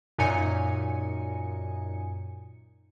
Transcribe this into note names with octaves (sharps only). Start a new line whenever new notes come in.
F#2 A#2 D#4 G#5 C#7